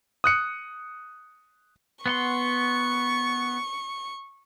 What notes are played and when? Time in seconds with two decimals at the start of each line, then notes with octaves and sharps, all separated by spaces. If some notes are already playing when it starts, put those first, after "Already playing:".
0.24 D#6 F#6 C#7
2.06 B3 F#5 C6 C#6